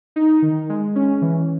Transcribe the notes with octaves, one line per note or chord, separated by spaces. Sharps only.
D#4
D#3
G#3
C#4
E3